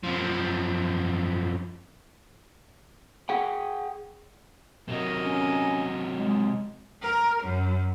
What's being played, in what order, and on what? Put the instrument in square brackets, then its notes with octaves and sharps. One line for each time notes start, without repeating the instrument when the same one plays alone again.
[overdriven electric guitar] F#2 F3
[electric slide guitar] G#4 F#5 G5
[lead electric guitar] C3 F#3 [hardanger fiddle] A#4 D#5
[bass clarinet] C#4
G#3
[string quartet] A#4
F#2